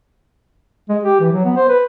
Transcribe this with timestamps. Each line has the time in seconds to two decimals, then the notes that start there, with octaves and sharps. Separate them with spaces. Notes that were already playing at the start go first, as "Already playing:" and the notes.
0.89 G#3
1.03 G4
1.20 E3
1.32 F#3
1.45 B3
1.57 C5
1.69 B4